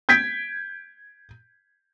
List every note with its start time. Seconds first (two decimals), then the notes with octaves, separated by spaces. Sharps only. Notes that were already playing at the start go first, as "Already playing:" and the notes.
0.09 G6 G#6 B6 D7